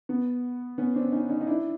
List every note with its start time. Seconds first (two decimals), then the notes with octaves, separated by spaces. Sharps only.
0.09 B3
0.78 B3 C#4
0.94 C4 D4
1.12 C#4 D#4
1.29 C#4 D#4
1.41 D#4
1.47 D4 E4